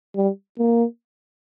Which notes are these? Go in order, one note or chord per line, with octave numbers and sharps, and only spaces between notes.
G3
A#3